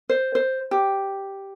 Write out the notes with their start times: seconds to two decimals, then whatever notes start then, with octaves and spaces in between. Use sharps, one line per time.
0.09 C5
0.35 C5
0.71 G4